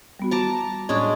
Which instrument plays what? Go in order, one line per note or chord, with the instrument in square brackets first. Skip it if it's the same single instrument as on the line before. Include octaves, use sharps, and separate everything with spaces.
[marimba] G3 B3 F#4
[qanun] A5 A#5 D6
[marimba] A2 C#6 G#6 [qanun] G#3 C#4 D4